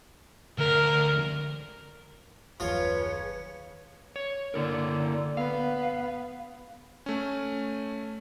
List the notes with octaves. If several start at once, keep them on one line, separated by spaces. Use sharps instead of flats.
D2 A#4
F#1 D#2 F3 F4 G#4 B4 C#5
C#5
D3 A#3 E4 A#4
B3 F5
A3 C#4